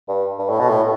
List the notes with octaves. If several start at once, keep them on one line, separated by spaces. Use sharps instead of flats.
G2
G2
A2
B2
A2